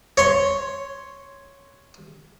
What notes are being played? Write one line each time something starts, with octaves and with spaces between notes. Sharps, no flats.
C#5 C6